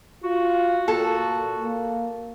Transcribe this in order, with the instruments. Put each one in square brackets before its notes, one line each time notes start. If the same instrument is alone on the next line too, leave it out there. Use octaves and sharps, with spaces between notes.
[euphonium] F4 [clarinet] F#4
[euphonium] A#2 [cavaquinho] A4
[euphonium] A#3